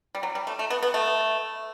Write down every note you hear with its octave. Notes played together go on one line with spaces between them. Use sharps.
G3
F#3
G3
A3
A3
B3
B3
A3